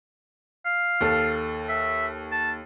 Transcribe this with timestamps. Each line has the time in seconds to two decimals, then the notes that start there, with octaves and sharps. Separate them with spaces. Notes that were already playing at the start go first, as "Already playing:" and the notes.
0.66 F5
1.01 D#2 A4
1.69 E5
2.32 A5